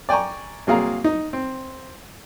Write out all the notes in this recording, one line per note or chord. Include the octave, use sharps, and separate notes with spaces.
D5 G5 G#5 A#5 C#6
C2 F#3 A#3 G#4 F5 A#5
D#4
C4